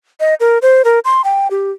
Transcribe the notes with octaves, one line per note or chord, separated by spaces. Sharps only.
D#5
A#4
C5
A#4
C6
G5
G4